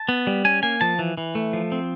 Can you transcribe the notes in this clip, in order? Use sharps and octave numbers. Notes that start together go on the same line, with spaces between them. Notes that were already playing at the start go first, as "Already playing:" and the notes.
Already playing: A5
B3
G3
C#4 G#5
A#3 G#5
F3 A5
E3
E3
A3
F3
C4